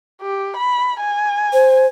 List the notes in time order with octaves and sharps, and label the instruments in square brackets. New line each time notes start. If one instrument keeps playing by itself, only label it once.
[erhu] G4
B5
G#5
[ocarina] C5